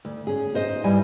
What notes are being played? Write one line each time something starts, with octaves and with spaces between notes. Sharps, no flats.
D2
C#4 G#4
D#4 C5 D#5
G2 G3 E4 B4 G#5